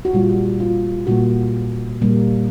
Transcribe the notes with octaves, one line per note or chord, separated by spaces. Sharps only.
F#4
A#2 G3 A#3 F4
F4
A#2 G3 A#3 F#4
A#2 G3 A#3